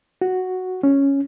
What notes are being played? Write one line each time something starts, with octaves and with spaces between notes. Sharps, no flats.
F#4
C#4